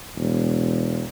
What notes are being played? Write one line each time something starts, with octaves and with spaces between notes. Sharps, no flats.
E1